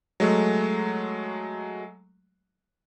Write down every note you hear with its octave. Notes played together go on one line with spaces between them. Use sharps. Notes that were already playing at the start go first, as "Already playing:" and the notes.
F#3 G#3 A3